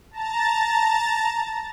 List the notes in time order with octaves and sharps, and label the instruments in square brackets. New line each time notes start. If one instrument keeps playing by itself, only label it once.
[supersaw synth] A5 A#5 A6